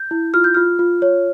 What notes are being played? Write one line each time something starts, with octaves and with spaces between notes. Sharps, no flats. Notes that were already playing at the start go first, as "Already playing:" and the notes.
Already playing: G6
E4
F4 F6
G6
F4 F6
F4
C#5